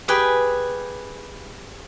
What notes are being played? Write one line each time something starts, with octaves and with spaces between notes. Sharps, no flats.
G4 G#4 B4 G5